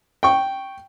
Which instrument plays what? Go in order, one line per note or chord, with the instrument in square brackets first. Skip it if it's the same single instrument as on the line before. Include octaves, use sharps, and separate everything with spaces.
[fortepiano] G5 C#6